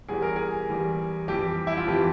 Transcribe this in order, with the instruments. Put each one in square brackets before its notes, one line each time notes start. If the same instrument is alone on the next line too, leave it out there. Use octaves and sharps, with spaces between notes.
[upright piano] E2 E3 G3 G#4
A#4
G#4
E2 E3 G3
F2 E3 G3 G4
E4
F4
F2 E3 G3 G4